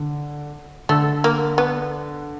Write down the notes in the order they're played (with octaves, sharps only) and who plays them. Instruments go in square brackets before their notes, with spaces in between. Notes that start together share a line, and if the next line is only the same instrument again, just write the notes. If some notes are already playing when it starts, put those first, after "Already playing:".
Already playing: [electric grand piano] D3
[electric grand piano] D3 [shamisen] A3
[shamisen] A#3
B3